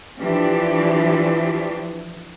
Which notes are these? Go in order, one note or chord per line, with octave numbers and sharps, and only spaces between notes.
E3 F3 D4 G4